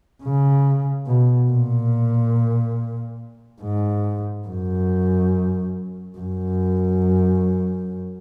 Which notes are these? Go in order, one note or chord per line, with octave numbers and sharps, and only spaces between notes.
C#3
B2
A#2
G#2
F#2
F#2